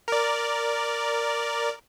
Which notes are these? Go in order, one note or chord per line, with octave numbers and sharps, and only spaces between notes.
A#4 D5